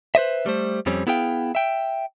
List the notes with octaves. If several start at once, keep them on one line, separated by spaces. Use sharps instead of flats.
B4 C5 D#5 E5
G3 A3 C5
F2 G3 C4 C#4
B3 E4 G#4 F5 G5
E5 G5